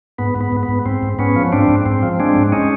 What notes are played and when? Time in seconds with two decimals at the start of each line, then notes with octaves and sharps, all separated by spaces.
0.18 G#2 B3
0.36 G#2 B3
0.52 G#2
0.63 B3
0.69 G#2
0.86 G#2 C4
1.03 G#2
1.19 G#2 B3 C#4
1.36 F3
1.52 G#2 C4 D4
1.69 G#2
1.86 G#2 C4
2.03 F3
2.20 G#3 C4 D4
2.36 G#2
2.52 G#3 C#4 D#4